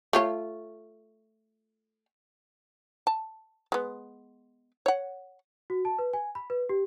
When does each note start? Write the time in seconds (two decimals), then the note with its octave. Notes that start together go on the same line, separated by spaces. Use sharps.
0.13 A3 F4 C#5
3.07 A5
3.72 G#3 B3
4.86 C#5 F#5
5.70 F#4
5.85 A5
5.99 B4
6.13 G#5
6.35 B5
6.50 B4
6.69 G4